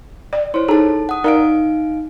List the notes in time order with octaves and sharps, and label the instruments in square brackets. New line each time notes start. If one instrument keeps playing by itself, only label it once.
[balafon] D5
[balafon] E4 [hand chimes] C5 C#5
[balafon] D#4 G#4 [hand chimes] A4 A5
[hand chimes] F#5 D#6
[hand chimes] D#4 F5 D7 [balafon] A#4 D5 A#5